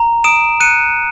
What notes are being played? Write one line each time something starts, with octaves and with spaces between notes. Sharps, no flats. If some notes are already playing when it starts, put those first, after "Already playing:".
Already playing: A#5
D#6 D7 E7
F#6 C#7 D#7